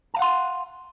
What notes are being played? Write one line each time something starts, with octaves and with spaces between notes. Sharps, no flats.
F5 F#5 A5 C6